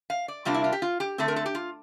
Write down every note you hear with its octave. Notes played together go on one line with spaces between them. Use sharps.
F5
D5
C3 G3 A#3 D4 F4
E4
F4
G4
F4
G4
D3 A3 C4 A4
A#4
A4
G4
F4